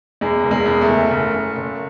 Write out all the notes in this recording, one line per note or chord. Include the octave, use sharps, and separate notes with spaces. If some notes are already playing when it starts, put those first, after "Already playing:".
E2 G#3
F#1
G#3
E2
A3
F#1
F#1
F#1
F#1